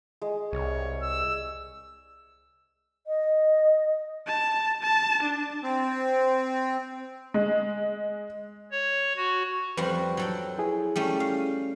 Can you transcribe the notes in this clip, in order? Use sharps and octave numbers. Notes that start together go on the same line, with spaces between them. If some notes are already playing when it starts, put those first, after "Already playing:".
G#3
C2 C#5
E6
D#5
A5
A5
D4
C4
G#3
C#5
F#4
F2 G3 F#4 B4 C5
F#3 A4 G5
E4 G#4
G3 A3 C#4
F5